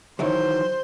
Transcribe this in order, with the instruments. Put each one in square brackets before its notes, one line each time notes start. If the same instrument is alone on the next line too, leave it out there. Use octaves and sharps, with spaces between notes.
[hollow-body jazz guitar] D#3 E3 F#3 [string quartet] C5